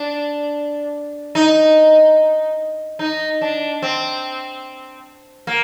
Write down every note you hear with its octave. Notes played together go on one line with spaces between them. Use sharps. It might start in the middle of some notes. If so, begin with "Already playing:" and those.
Already playing: D4
D#4
D#4
D4
C4
A#3